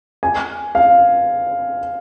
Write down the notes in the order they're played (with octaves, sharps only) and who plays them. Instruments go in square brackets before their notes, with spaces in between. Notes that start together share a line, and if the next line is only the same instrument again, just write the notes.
[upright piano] G#5
F5